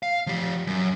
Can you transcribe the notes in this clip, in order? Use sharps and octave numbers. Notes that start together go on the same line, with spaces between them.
F5
F3 G4
F#2